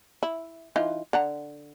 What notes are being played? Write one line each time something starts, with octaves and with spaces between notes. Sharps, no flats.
E4
E3 D#4 F4
D3 F#5 A#5